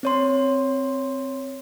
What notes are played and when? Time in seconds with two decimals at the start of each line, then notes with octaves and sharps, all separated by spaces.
0.03 C4 C#5 C6